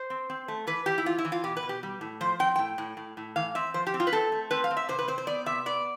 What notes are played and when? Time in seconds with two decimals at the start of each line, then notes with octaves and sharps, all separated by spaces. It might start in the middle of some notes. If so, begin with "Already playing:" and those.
Already playing: C5
0.10 C4
0.30 C4
0.48 A3
0.67 E3 B4
0.86 E3 G4
0.98 E4
1.06 C4 F4
1.18 E4
1.25 E3
1.32 F4
1.44 B2 G4
1.57 B4
1.63 B2
1.69 G4
1.83 G3
2.01 A2
2.21 F3 C5
2.39 C4 G5
2.56 A2 G5
2.78 A2
2.97 A2
3.17 A2
3.36 E3 F5
3.55 C4 E5
3.74 F3 C5
3.87 G4
3.94 C4
4.00 F4
4.07 B4
4.12 C4 A4
4.32 A3
4.51 C4 B4
4.64 F5
4.71 C4
4.77 E5
4.89 C3 C5
4.99 B4
5.08 C4 C5
5.18 C5
5.27 B3 D5
5.46 C3 E5
5.66 B3 D5